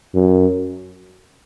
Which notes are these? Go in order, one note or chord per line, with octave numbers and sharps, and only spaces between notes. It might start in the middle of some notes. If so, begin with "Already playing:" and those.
F#2